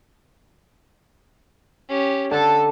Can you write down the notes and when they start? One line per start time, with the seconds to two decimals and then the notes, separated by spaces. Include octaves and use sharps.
1.89 C#4 G4
2.31 D3 A4 A5